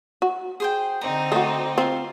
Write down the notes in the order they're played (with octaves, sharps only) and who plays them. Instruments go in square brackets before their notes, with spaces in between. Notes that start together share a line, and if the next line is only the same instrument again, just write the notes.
[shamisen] F#4
[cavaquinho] G#4 C5 G5
[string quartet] D3 C4 D#4 [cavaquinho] A#5
[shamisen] A3 F#4 [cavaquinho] C5 D5 D#5
[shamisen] C4 [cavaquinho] F4 F5